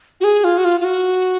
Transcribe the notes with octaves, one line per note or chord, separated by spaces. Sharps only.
F#4
G#4
F4
F#4
F4
F4
F#4